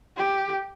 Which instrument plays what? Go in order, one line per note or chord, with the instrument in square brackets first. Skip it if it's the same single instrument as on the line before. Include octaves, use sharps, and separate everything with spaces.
[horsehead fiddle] G4